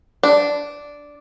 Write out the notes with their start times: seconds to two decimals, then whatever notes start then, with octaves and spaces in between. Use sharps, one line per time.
0.23 D4